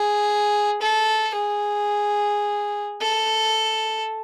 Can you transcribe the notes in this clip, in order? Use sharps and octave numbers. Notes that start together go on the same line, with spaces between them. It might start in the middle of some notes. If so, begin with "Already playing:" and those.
Already playing: G#4
A4
G#4
A4